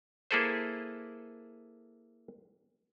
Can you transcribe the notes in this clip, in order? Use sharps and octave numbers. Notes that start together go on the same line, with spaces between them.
A#3 E4 G#4 A4 B4 C5